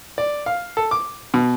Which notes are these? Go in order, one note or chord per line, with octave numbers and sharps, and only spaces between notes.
D5
F5
A4
D6
B2